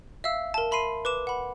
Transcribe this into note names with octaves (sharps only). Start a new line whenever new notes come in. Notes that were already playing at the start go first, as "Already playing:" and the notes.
E5 F5 E6
A#4 A5
E5 B5 C6 C7 D#7
B4 D6 E7
F#5 B5